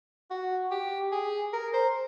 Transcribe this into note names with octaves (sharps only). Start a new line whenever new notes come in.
F#4
G4
G#4
A#4
C5